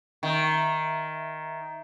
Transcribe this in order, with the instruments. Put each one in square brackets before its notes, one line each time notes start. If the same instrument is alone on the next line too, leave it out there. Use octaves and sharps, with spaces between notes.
[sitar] D#3 [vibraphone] E5 A#5